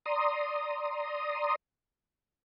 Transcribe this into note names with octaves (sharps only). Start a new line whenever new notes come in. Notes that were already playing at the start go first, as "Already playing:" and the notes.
D5 A#5 C6 D#6